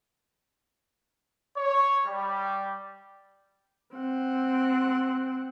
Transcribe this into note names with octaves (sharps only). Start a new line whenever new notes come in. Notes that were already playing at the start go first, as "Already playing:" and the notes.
C#5
G3
C4 F#5